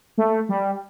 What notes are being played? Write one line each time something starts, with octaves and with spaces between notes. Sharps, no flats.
A3
G3